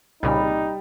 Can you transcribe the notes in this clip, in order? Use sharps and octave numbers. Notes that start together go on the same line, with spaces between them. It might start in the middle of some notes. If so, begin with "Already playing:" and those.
C2 A#2 C#3 G3 D#4